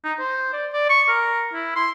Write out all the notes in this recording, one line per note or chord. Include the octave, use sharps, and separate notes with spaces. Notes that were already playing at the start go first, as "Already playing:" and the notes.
D#4
C5
D5
D5
C#6
A#4
E4
C6